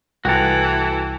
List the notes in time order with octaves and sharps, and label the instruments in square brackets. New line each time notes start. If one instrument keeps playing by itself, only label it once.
[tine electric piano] C2 G5 F#6 [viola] E3 [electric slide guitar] F#4 A4